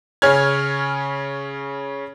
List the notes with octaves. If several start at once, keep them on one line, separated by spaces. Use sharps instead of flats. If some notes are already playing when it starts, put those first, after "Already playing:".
C#3 C#4 C#5 G#5 F6 G#6